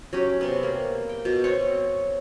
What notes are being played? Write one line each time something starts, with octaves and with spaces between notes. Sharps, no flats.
F#3 C#4 G4
C3 B3
A#3
G5
B2
C4 C#5 C#6